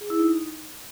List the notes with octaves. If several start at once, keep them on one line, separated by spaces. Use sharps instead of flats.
G#4
E4
D#4